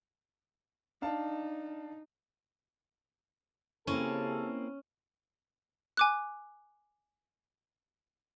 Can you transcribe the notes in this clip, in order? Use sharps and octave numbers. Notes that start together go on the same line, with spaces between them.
D4 D#4 F5 A5
C#3 A#3 C4 C#4 E4 G4 A4
G#5 D6 F#6